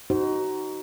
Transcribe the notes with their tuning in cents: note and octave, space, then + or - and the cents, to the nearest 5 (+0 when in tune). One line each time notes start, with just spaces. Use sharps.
D#4 +0 F#4 +30 C5 +0